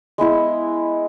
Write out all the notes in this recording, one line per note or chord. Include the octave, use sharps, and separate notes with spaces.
G#3 B3 E4 G#4